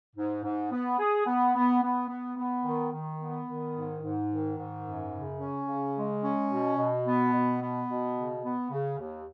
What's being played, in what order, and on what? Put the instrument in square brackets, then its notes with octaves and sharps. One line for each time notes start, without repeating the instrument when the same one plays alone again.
[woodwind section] G#2
G#2
B3
G#4
B3
B3
B3
B3
B3
D#3
D#3
B3
D#3
G#2
G#2
D#3
G#2
F#2
C#3
C#4
C#3
G#3
C#4
B2
B2
B3
B2
B3
B2
C#3
B3
C#3
D#2